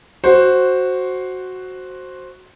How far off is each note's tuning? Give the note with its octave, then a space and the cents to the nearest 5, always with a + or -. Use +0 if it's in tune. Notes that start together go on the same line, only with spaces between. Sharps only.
F#4 +0 C5 +5